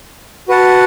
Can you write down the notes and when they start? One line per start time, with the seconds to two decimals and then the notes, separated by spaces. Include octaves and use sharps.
0.48 F#4 B4 F#5 A5